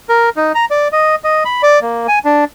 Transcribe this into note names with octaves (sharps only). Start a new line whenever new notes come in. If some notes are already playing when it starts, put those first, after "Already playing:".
A#4
D#4
A#5
D5
D#5
D#5
B5
D5
A#3
G#5
D4